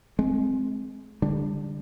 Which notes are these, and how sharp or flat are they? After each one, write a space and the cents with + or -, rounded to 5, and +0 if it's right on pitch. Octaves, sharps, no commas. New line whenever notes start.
G#3 +20 C4 +0
D3 +0 G3 +25